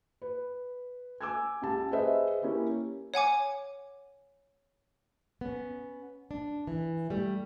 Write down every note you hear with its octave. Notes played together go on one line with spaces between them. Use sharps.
B4
G#5 D6 E6 G#6
C#2 G4 A5
G#4 B4 C5 D#5 E5
A#3 C#4 E4 G4 A#4
C#5 F#5 G#5 D6
B3 C#4
D4
E3
G3 A3